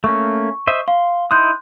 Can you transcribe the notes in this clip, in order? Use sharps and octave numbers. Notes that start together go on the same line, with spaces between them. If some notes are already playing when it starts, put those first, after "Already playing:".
A3 A#3 C#4 C#6
C5 D#5 E5
F5 C6
D#4 E4 C6 D#6 F#6 G6